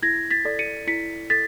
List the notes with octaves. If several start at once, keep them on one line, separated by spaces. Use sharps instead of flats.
E4 G#6 A#6
A6 B6
A4 D5
C#7 D#7
E4 B6 C#7
A4 A6 B6